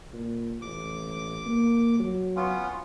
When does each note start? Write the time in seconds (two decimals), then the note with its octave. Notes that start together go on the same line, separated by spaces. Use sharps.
0.14 A#2
0.62 A1 D6
1.45 A#3
1.99 F#3
2.36 B3 C#4 F4